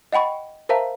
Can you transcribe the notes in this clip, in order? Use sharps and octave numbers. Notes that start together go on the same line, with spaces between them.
D#5 F#5 G5 B5 C#6
A#4 C5 E5 F5 A5 A#5